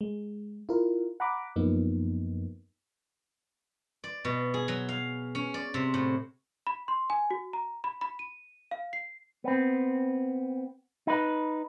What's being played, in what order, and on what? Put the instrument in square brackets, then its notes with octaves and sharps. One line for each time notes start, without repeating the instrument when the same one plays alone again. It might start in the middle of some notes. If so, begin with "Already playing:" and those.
[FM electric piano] G#3
E4 F4 A#4
F#5 A#5 B5 D6
F#2 F3 A#3 B3 D#4
[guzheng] D5
B2
G#4
F#3
F5
C#4
D5
C3
A2
[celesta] B5
C6
G#5
F#4
A#5
B5
B5
D#7
F5
C7
[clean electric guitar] B3 C4
D#4 B4